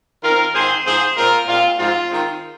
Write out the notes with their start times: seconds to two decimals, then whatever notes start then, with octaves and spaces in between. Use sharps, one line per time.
0.24 D#3 C4 F4 A#4
0.54 G#2 D#3 C4 G#4 C5
0.85 G#2 F3 C4 G#4 C5
1.16 A#2 G#3 C4 F4 A#4
1.48 A#2 G#3 C4 F4
1.78 G#2 F3 G#3 C4 F4
2.09 D#3 G#3 C4